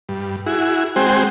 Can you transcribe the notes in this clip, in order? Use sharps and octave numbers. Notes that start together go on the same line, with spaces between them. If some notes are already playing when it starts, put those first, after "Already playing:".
G2
E4 F#4 G#4
G#3 C4 F#4 G#4 C5 G5